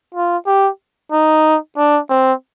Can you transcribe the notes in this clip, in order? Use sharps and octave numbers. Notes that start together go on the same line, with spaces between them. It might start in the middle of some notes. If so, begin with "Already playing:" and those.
F4
G4
D#4
D4
C4